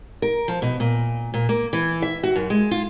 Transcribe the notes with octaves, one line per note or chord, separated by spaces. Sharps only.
A#4
F3
B2
A#2
A#2
A#3
E3
E5
F#4
F#2
G#3
F4